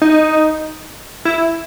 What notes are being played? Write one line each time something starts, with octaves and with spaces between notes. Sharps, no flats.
D#4
E4